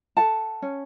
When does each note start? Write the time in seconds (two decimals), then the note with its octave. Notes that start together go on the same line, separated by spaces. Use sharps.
0.17 A4 F#5 A5
0.62 C#4